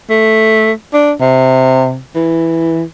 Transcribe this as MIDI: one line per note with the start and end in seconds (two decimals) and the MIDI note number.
0.10 0.72 57
0.94 1.12 62
1.21 1.99 48
2.15 2.83 52